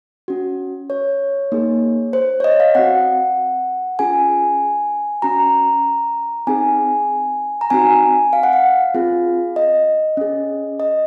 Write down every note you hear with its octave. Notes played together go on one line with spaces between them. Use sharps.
C#4 F#4
C#5
A#3 D#4 G#4
C5
C#5
D#5
F5
C4 F#4 F#5
C#4 F4 G#4 G#5
C#4 F#4 A#5
C4 D#4 G#4 G#5
A#5
C4 D#4 F#4 G#5
F5
F#5
F5
C4 F4 G#4
D#5
C#4 G#4
D#5